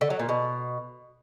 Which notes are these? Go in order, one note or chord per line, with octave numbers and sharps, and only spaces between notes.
D3
F#3
A#2
B2